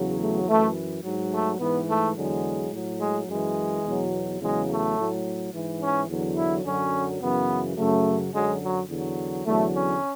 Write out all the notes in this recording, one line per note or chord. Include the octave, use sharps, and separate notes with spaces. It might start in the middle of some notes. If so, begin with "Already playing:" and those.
Already playing: E2 C#3 F#3
A3
F#2 E3 A3
G#2 F#3
A3
G#2 E3 B3
A3
E2 D3 F#3 G#3
A2 F#3
G#3
F#2 E3 G#3
E2 B2 F#3
E2 C#3 F#3 G#3
A3
A2 F#3
G#2 E3
C#4
E2 D3 F#3
E4
F#2 D3 F#3 C#4
F#2 C#3 E3 B3
F#2 C#3 F#3 A3
F#2 D3 F#3 G#3
F#3
E2 D3 F#3
E2 D3 F#3 A3
C#4